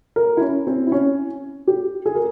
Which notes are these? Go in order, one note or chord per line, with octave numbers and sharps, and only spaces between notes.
A#4
E4
C#4
C4
E4
C#4
G4
G#4
A#4